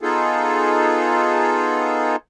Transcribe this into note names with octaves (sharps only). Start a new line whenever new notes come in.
B3 D#4 F4 G#4 A4